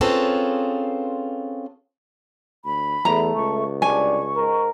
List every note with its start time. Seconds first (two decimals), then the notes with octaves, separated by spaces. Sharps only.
0.01 C4 C#4 F4 G#4 A4 B4
2.65 D2 B5
3.05 E2 A3 A#5
3.35 C#2 C#6
3.82 C2 G3 D4 G#5 C#6
4.36 G#2 G#3 A#4